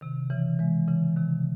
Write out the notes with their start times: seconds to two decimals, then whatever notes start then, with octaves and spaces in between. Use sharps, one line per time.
0.01 C3 D#3
0.30 C#3 E3
0.59 E3 G#3
0.88 C#3 E3
1.17 C3 D#3